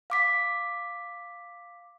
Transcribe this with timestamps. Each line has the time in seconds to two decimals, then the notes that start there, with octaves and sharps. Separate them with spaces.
0.10 F5 D6 B6